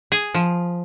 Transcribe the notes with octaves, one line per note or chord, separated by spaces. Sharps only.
G#4
F3